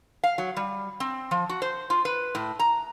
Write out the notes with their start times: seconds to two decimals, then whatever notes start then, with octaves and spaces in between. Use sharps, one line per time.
0.24 F5
0.38 F#3
0.56 G3
1.00 C4
1.31 F3
1.49 F#4
1.62 C5
1.90 F4
2.05 B4
2.35 A2
2.59 A#5